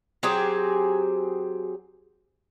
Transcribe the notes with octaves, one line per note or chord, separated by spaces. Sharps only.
F#3 C4 G4 G#4